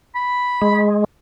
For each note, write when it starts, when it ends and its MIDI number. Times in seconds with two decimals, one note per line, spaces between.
0.15 0.82 83
0.62 1.04 56